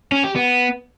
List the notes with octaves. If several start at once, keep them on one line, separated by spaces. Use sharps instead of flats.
C#4
G4
B3